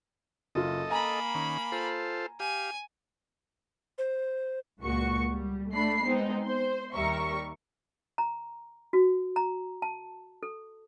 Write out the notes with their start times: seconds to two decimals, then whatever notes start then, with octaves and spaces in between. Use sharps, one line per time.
0.55 F#1 F4 A4 D#5
0.90 A#3 G#5 A#5 B5
1.35 D#3 C#4
1.72 F4 A4 C5
2.40 G4 F5 G#5
3.98 C5
4.81 C#2 A#2 F#4 C#6 C#7
5.30 G3
5.72 A3 D4 B5 C7
6.03 G#3 B3 C4 D#4
6.42 C5 C6
6.94 D#2 G3 A#4 E5 C#6
8.18 A#5
8.93 F#4
9.36 A#5
9.82 A5
10.43 A4